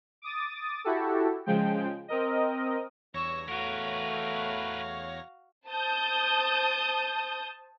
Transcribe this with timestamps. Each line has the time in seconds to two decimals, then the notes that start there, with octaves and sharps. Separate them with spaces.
0.22 D6 D#6 A6
0.84 E4 F#4 G4 A4
1.46 C#3 F3 G#3 G5
2.08 C4 A#4 D#5
3.14 E2 G2 C#5 C#6 E6 A#6
3.48 A3 F#4 A#4 B4 F5
5.68 C5 A5 D#6 G6